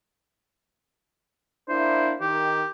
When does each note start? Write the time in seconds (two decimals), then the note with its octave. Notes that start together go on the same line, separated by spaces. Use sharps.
1.69 A#3 D4 E4 C5
2.21 D#3 G4